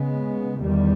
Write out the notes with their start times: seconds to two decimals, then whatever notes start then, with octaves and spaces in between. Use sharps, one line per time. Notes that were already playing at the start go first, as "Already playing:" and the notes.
Already playing: C#3 G#3 B3
0.62 E2 D#3 G3